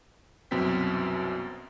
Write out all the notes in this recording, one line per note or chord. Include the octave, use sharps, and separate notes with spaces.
C2 F#2 B2 C4 G5 B6